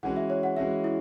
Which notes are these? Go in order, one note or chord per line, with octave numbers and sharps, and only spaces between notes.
E3 G#3 C#4 F#4 F#5
E5
C#5
F#5
E3 G#3 C#4 F#4 E5
E4